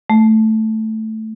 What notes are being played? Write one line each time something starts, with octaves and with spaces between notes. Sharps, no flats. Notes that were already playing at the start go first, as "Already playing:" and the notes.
A3